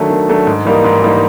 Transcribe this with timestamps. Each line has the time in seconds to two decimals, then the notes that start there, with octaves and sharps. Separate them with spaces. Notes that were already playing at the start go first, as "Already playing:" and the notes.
Already playing: D#3 F#3 A3 D4
0.10 D#3
0.28 F#3 A3 D4
0.47 G#2
0.65 E3 G3 A#3 D#4
0.84 G#2
1.03 E3 G3 A#3 D#4